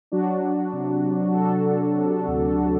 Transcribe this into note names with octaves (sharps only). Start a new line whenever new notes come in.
F#3 D4 F#4
F#3
C3
C3
F#3 F#4 A4
F#3
C3
D2